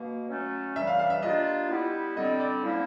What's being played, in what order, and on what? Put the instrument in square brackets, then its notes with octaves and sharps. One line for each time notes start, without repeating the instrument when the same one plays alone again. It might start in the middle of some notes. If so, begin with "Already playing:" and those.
Already playing: [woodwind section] B2 A#3
F#3 A3 C#4
[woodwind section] C#3 E3 G3 [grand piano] E5
[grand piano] F5
F5
E5
[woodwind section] G3 A#3 D4 F4 [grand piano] D#5
[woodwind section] G3 B3 E4
[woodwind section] D3 G3 C4 [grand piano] D#5
[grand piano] D5
[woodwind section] D3 F3 A#3 C#4 E4